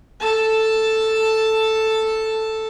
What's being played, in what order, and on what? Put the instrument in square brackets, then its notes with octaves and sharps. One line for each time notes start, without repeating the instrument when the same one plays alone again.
[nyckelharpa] A4 A5